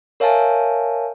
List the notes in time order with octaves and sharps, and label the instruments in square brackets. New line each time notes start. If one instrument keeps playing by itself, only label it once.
[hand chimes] A#4 C#5 E5 F5 G#5 A5